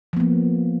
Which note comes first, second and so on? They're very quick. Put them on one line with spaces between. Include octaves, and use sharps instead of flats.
F3 B3 A#3